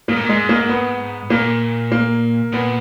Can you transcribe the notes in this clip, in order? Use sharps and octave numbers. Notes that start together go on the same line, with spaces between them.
G#2 A#3
A#2
G#2
G#3
A#3
B3
A#2 A#3
A#3
A#2 B3